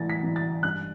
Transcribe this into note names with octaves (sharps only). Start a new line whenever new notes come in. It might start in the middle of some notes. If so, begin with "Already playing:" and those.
Already playing: A2 E3 A6
B6
E3
A6
G2 F#6